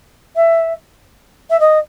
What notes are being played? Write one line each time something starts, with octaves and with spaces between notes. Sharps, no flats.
E5
E5
D#5